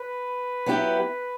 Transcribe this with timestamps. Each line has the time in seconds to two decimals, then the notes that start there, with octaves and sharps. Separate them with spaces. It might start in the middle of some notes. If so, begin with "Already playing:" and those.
Already playing: B4
0.66 F#3 B3 E4 G4